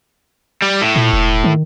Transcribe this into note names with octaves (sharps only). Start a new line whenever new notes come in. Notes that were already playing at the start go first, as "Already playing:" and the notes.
G3
A2
A#2
E1
D#3